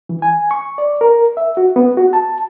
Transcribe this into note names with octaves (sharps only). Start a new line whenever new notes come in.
E3
G#5
C#6
D5
A#4
E5
F#4
B3
F#4
A5